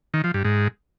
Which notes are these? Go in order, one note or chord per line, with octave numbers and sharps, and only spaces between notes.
D#3
F3
G2
G#2